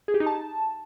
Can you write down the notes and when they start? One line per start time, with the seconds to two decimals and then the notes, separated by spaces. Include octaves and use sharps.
0.08 G#4
0.14 G4
0.20 D#4
0.26 A5